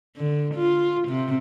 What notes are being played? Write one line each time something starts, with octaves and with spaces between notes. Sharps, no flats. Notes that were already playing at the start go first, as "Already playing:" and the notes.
D3
F4
C3